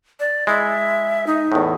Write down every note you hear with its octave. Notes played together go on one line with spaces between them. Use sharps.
D5
G#3 E4 E5
D#4
E2 A2